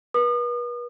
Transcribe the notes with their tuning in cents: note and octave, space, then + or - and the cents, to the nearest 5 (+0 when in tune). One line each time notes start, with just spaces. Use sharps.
B4 -40 D#6 -40